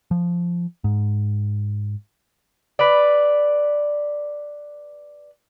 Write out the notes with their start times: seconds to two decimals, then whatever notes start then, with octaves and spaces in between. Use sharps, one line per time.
0.11 F3
0.84 G#2
2.79 B4 D5